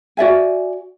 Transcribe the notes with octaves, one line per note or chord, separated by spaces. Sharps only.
F#4 D5 E5 G#5